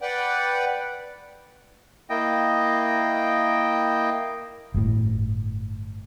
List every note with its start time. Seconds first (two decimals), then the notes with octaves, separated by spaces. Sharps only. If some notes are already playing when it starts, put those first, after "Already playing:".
0.01 B4 D5 F#5 G5
2.10 A#3 E4 D#5 G5
4.74 G1 A2